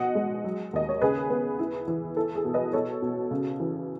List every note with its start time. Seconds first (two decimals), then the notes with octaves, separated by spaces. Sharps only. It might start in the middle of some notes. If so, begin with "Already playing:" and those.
Already playing: B2 D#5 F#5
0.15 G#3
0.44 F#3
0.73 D#2 D#5
0.89 C#5
1.01 C#3 G#4 B4
1.30 B3
1.59 E4
1.88 E3
2.17 E4 A4
2.35 G#4
2.45 B2
2.54 B4 D#5
2.73 B2 A4 C#5
3.02 B2
3.31 C#3
3.60 E3